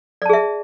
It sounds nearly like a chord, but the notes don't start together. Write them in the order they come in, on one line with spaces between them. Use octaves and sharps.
D5 A5 G#4 E5